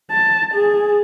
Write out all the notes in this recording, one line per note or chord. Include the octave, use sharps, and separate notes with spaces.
A5
G#4